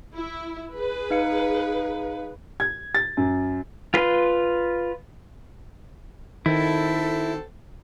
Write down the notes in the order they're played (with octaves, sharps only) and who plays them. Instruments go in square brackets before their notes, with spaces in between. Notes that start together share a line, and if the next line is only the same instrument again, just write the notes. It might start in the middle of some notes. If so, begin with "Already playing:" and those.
[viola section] E4
G#4 B4
[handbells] D#4 F5 C#7
[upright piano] G#6
A6
F#2
[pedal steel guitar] F4 B4 C6
[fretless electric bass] D#3 [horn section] C4 F#4 A4 [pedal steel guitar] E4